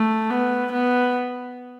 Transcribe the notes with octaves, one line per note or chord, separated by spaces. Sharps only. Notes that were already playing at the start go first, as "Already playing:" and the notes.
Already playing: A3
B3
B3